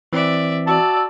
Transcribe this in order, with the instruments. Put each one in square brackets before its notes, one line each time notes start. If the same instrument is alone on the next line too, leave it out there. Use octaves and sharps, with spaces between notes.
[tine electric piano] E3 C4 [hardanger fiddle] D5 E5
[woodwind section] F#4 E6 [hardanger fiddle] D5 [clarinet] A5